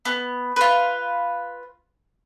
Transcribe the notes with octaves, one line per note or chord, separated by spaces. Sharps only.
B3
F4 B4